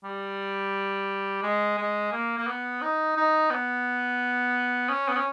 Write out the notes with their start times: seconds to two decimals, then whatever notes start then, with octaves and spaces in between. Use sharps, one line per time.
0.04 G3
1.43 G#3
1.78 G#3
2.12 A#3
2.38 A#3
2.47 B3
2.82 D#4
3.17 D#4
3.50 B3
4.90 C#4
5.09 B3
5.17 C#4